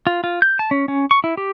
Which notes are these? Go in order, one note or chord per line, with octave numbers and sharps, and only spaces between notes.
F4
F4
G6
A5
C#4
C#4
C#6
E4
G4